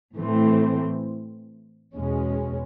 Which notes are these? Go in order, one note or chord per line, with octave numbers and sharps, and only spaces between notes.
A2 E3 A3 C4
E2 B2 G#3 C#4